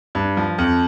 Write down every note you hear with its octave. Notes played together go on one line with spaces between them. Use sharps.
G2
F3
F2